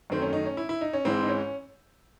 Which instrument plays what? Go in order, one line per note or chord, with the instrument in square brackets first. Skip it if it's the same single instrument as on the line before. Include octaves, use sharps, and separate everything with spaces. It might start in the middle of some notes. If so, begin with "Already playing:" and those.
[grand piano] F#2 D#3 A3 C4
C#4
D#4
C#4
E4
E4
D#4
C#4
G#2 E3 G#3 C4
D#4
C#4